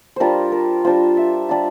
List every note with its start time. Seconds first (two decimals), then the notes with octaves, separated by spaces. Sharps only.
0.16 G3 D4 F4 A#4 C5
0.52 A#4
0.85 G3 D4 F4 C5
1.17 E5
1.49 G3 D4 F4